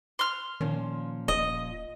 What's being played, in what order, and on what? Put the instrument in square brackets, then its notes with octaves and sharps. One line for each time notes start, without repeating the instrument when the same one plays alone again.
[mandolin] C6 F6
[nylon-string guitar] A#2 F3 C#4 [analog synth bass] D#3
[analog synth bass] D#1 [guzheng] D#5